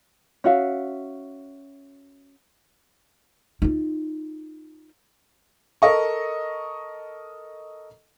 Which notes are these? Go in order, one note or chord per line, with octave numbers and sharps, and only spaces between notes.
C#4 F#4 E5 F5
D#4 F4
A4 A#4 D#5 C#6